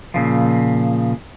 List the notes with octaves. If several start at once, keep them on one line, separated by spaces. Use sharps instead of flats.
A#2 C#3 F3